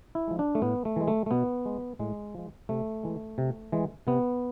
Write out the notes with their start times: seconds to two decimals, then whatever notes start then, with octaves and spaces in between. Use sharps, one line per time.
0.15 E4
0.27 F3 G#3
0.39 D4
0.55 A3
0.62 A2 B3
0.85 A3
0.96 E3 G#3
1.08 A3
1.26 A3
1.31 B2 B3
1.65 G#3
1.99 A2 G#3
2.34 F3 G#3
2.69 C3 A3
3.03 E3 G#3
3.38 C3
3.72 E3 G#3
4.07 C3 B3